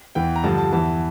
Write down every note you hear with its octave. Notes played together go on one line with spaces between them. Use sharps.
E2 E3 G5
A#5
G2 D3 F3 A5
A5
E2 E3 A5